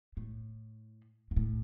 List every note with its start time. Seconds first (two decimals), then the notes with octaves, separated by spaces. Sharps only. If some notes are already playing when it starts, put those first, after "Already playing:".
0.17 A2
1.31 G#2
1.36 A2